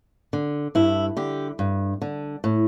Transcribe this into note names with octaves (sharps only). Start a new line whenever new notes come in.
D3
G2 E4
D3 G4
G2
D3
A2